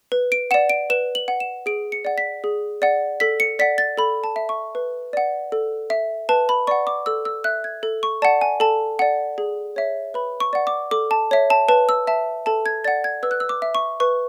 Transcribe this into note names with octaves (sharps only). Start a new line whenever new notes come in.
B4
D7
D5 F#5 E7
D7
B4 E7
F#7
F#5
E7
G#4 D7
C#7
D5 F#5
B6
G#4
D5 F#5
A4 B6
C#7
D5 F#5 B6
A6
A4 B5
A5
E5
C#6
B4
D5 F#5
A4
E5
B4 A5
B5
D5 F#5 C#6
D6
A4 E6
E6
E5 F#6
G#6
A4
C#6
D5 F#5 A5
G#5
A4 A5
D5 F#5
G#4
C#5 E5
B4 B5
C#6
D5 F#5
D6
A4 D6
A5
C#5 E5
A5
B4 A5
E6
E5 A5
A4 A5
G#6
D5 F#5 A6
G#6
B4 E6
F#6
E6
D6
E5
C#6
B4 C#6